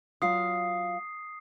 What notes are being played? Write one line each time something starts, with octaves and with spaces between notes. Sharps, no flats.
F#3 F4 F5 D#6 C7